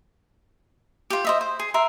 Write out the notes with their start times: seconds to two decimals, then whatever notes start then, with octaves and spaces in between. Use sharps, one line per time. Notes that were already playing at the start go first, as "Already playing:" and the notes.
1.10 F4 G4
1.25 C5 D#5 E5
1.41 C5
1.59 G#4
1.74 A#4 E5 C6